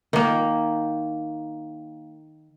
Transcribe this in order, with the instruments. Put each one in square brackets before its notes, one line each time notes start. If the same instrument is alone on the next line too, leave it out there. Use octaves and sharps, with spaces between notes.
[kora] D#3 A#3